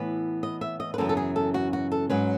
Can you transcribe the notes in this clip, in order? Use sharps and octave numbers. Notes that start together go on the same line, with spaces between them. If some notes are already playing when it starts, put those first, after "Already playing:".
Already playing: A2 E3 B3 B4
D#5
E5
D#5
B4
F#2 C#3 E3 B3 A4
A4
G#4
A4
F#4
F#4
A4
G#2 F#3 C#4 B4